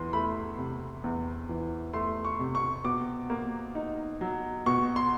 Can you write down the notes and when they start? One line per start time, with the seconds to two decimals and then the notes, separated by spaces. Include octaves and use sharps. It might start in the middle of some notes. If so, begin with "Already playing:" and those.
Already playing: E2 E3 C6
0.13 A3 B5
0.58 C3
1.04 E2
1.49 E3
1.93 A3 C6
2.25 C#6
2.39 C3
2.55 C#6
2.85 B2 D6
3.30 A#3
3.75 D#4
4.21 F#3
4.66 B2 C#6
4.96 C6